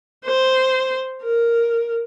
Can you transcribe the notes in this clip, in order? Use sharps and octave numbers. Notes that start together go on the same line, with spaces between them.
C5
A#4